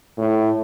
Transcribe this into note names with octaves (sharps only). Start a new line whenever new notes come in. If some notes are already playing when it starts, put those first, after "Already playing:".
A2